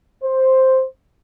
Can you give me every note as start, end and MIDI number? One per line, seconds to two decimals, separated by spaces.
0.24 0.85 72